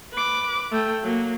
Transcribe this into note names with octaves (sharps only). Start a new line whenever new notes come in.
B4 D6
A3 G5
F#3 A#3